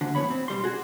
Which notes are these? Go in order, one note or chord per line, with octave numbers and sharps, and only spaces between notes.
D2 D3
E2 A2 C#3 B3 C#5 B5
C4
B2 G3 C6
F#4 G#4